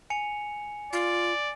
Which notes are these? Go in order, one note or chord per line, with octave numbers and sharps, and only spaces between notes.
G#5 C#7 F7
F4 D5